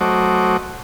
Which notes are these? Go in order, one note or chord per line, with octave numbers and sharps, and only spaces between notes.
F#3 A3 F#4 C5 D#5 D6